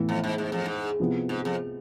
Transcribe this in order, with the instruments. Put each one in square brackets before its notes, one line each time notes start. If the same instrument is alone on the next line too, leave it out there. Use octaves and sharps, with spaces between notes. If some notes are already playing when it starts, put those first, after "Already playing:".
Already playing: [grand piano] A2 E3 B3 E4
[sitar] F2
G#2
G#2
F2
G#2
[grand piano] C3 F3 B3 E4
[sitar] G#2
F2